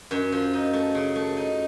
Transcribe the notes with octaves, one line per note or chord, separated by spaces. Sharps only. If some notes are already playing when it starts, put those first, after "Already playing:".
F#2
F3
D#4
A3
C#3
A3
D#4